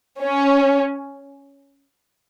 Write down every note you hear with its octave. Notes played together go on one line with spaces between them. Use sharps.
C#4